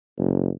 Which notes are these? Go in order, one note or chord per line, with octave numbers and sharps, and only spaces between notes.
F#1